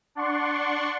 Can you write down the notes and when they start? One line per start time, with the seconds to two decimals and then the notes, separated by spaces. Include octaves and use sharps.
0.15 D4 D5 F#5 C6 C#6